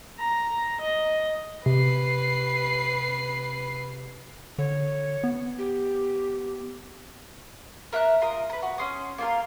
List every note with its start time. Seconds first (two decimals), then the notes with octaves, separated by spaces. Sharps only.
0.19 A#5
0.80 D#5
1.66 C3 B4 C7
4.58 D3 C#5
5.24 B3
5.58 G4
7.93 A#4 E5 A#5 F#6
8.21 F4 A#4 D#5
8.50 A#4 B4
8.62 F#4
8.78 C#4 C6 D#6
9.18 A#3 F4 A#4